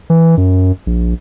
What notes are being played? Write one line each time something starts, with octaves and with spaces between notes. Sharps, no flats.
E3
F#2
A#1